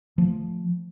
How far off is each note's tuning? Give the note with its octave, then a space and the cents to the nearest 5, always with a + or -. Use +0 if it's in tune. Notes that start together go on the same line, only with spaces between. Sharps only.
F3 +0 A3 +0